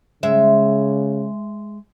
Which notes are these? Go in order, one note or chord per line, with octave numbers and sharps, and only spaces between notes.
C#3 G#3 E5